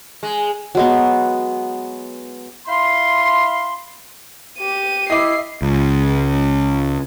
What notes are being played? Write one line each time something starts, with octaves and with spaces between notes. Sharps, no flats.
G#3
F#3 G#3 B3
E4 F5 B5 C6
G4 D#7
E4 D#5 E5 D6 C7
C#2